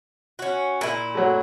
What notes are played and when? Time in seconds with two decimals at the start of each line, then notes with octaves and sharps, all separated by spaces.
0.39 C#4 F#4
0.81 A#2 E4
1.15 F#3 A3